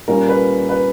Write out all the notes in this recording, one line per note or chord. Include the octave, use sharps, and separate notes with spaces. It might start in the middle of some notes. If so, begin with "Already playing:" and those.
A#2 G3 C#4 A#4
B4
B4